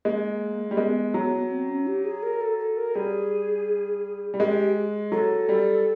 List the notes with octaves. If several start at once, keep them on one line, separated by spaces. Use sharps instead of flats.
G#3 A#3
G3
G#3 B3
F#3
C4
C#4
G4
G#4
A#4
A4
A4
A#4
G3 G#4
G3
G#3 G4
F#3 A4
G3